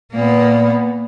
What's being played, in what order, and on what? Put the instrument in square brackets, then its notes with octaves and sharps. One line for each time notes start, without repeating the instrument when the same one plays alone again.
[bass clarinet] A#2 [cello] A#3 B3